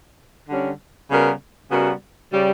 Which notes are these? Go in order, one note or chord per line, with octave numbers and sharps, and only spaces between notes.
D3 G3 C#4
C#3 G3 B3 F#4 A#4
C#3 G3 B3 F#4 A#4
C#3 G3